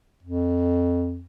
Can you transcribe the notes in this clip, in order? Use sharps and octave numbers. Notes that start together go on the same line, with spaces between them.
F2